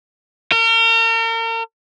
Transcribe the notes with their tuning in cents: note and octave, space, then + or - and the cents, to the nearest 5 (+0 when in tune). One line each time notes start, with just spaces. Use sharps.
A#4 -40